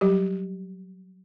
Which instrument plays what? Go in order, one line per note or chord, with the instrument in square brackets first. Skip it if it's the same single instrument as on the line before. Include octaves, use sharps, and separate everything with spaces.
[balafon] F#3 G3 G4